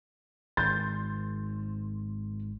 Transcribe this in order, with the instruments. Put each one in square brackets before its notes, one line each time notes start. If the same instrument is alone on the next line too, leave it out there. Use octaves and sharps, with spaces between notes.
[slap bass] G#1 [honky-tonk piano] C6 G6 A6